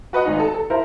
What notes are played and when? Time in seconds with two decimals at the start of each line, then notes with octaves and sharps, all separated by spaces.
0.13 F#4 B4 D#5 F#5
0.25 G#1 D#4
0.40 A4
0.54 A4
0.70 E4 A#4 C5